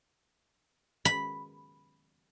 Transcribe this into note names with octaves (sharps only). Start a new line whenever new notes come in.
B5